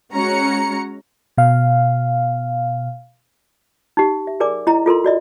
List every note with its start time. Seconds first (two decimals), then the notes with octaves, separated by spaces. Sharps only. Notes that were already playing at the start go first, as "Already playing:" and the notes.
0.12 G#3 C#4 F#4 A#5 C#7
1.37 B2 F5
3.97 D#4 G4
4.27 E5
4.40 G#4 A#4 D5 G#5 D6
4.67 E4 D#5 A#5
4.86 F4 A4 A#4 C6
5.04 F#4 D5 D#5